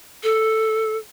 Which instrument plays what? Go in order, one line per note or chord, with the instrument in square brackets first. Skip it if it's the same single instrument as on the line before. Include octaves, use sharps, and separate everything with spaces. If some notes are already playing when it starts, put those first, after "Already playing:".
[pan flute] A4